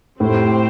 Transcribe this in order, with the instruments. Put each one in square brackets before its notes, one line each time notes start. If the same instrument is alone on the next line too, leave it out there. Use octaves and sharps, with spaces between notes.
[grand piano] A2 [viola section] C4 G4 C5